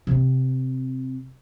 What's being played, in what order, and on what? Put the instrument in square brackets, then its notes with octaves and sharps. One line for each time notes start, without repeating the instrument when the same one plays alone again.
[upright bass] C3 C4